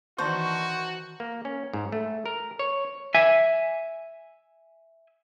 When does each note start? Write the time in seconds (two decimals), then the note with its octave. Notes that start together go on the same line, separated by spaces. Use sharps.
0.18 D#3 E3 F#4 C5 D5 A5 C#6
1.20 A#3
1.45 C#4
1.73 G#2
1.92 A3
2.26 A#4
2.59 C#5
3.15 E5 G#5